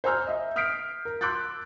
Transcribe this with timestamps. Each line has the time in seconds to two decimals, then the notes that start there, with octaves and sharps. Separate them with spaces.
0.04 C5 G#5 A#5 E6 F6 G6
0.27 D#5 E5
0.56 D#6 F6 G6 B6 C7 D7
1.05 A#4
1.21 C6 D6 E6 F#6 G6 A6